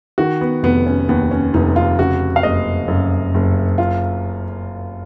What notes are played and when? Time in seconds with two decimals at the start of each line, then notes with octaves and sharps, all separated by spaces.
0.18 D#3 F#4
0.41 B3
0.63 F1 B3
0.87 C#4
1.09 D#2 B3
1.31 C#4
1.54 F1 D#4
1.76 F4
1.99 C#3 F#4
2.36 F5
2.43 F#1 D#5
2.88 F#2
3.34 F#1
3.78 F4